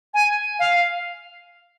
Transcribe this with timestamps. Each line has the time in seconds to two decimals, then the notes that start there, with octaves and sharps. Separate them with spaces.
0.14 G#5
0.59 F5